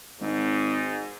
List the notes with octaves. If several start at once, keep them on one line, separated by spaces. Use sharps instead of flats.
G#1 G#2